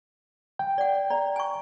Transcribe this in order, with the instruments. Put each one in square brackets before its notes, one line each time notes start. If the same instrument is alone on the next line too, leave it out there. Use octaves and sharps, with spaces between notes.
[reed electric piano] G5
[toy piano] D5 F#5
[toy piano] D5 [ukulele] A#5
[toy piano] G#5 C#6